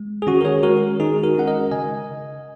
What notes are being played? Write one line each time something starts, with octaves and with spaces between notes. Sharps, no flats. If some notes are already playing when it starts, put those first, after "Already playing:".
Already playing: G#3
G#4
D#3 C#4 F#4
A#4
G#4 C#5
G#3 C#4 F#4 A#4
D#3 D#4 G#4
F#4 A#4
G#3 C#4 F#5
A#4 D#5
C#3 D#5 G#5